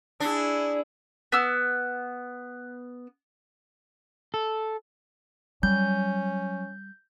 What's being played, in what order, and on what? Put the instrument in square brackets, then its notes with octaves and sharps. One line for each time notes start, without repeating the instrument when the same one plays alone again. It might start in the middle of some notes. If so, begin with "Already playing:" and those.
[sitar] D4 [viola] E4 G#4
[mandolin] B3 E6 F6
[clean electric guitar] A4
[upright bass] F#3 [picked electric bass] G3 [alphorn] C#4 [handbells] G6